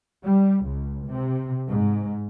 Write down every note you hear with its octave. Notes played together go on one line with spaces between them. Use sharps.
G3
C#2
C3
G#2